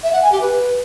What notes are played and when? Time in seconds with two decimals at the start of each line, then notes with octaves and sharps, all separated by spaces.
0.03 E5
0.13 F#5
0.22 G#5
0.32 G4
0.42 B4